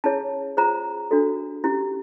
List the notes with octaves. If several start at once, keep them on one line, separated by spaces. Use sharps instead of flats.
C#4 E4 G#4 C#5 A5
F4 G#4 C5 A#5
D4 F#4 A4
C#4 E4 G4